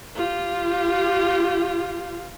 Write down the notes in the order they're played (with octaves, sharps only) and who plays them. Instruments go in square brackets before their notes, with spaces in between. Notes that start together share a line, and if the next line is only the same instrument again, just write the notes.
[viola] F4 G4